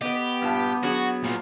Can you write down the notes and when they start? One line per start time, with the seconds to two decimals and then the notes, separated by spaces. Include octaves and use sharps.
0.01 B3 G4 B4 D#5
0.42 G2 A#2 A5
0.83 F#3 D4 F#4 G#4
1.24 A#2 F3